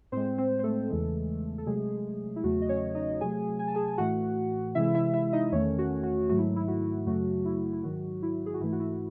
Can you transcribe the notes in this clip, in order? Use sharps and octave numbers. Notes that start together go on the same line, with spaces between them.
A2 G#3 C4 C5
C4 C5
C5
A3 A4
E2 C#3 E3 G#3
A4
C3 F#3 G#3 A3 G#4
E4
E2 C#3 F#3 A3 F#4
D#5
C#4 C#5
D#4 D#5
C3 F#3 A3 G#4 G#5
G#5
A5
G#4 G#5
G#5
A2 E3 A3 F#4 F#5
C3 E3 G#3 E4 E5
E4 E5
E4 E5
D#4 D#5
E2 D#3 A3 C#4 C#5
F#4
F#4
G#2 D#3 F#3 A3 F#4
E4
E4
F#4
F#2 C#3 F#3 A3 F#4
E4
E4
G#2 D#3 F#3 F#4
E4
G#4
F#4
G#2 E3 A3 E4
F#4
E4